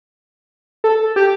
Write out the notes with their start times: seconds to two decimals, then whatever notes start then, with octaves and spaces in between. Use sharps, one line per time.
0.84 A4
1.16 G4